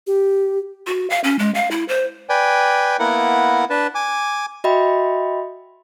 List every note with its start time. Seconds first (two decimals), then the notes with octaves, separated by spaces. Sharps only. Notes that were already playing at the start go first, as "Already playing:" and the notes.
0.07 G4
0.87 F#4
1.10 F5
1.24 C#4
1.39 G#3
1.55 F5
1.71 E4
1.89 C5
2.29 B4 D5 G5 G#5
2.99 A#3 B3 E4 A#4 F#5
3.70 D4 B4 A5
3.95 G#5 D6
4.64 F#4 D#5 E5 G5 B5